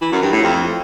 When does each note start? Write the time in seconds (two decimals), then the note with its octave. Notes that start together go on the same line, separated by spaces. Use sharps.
0.02 E3
0.12 F#2
0.22 G2
0.32 A2
0.43 F2